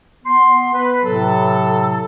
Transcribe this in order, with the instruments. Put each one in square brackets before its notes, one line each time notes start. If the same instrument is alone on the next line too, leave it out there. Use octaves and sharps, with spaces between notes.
[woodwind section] B3 C6
B4
A2 C3 F#3 A4